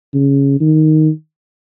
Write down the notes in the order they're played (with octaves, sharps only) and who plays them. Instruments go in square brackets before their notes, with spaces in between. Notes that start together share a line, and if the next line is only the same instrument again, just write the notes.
[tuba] C#3
D#3